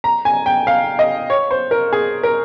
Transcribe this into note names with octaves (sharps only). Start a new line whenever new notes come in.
A#5
G#5
G5
F5
D#5
C#5
C5
A#4
G#4
A#4